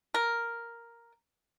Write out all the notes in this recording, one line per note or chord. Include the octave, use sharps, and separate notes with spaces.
A#4